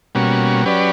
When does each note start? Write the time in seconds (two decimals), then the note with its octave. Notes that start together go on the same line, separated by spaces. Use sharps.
0.15 B2 G3 A#3 C#4 F#4
0.64 F#3 C#4 G4 B4 D5